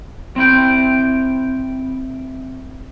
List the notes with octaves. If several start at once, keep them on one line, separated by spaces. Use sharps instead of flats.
C4 E4 G5